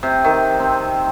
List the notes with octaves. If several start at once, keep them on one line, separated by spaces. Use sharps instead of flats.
C3
D#3
C4